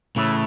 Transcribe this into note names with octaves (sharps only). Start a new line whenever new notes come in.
A2 C#3 E3 A3 E4